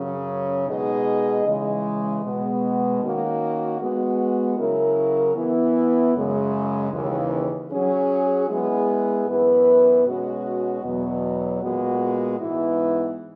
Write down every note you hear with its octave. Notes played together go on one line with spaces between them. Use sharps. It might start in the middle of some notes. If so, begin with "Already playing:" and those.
Already playing: F#2 C#3 F#3 C#4
B2 G#3 D#4 G#4 D#5
C#3 E3 G#3
B2 G#3 B3
D#3 A#3 C#4 F#4
G#3 B3 F#4
C#3 F#3 C#4 E4 A#4
E3 B3 E4
F#2 C#3 G#3
D#2 C#3 E3
F#3 C#4 G#4
G#3 B3 E4 G#4
F#2 E3 B3 E4 B4
B2 G#3 C#4 F#4
E2 B2 F#3
A#2 G#3 B3 F#4
G#2 E3 B3 E4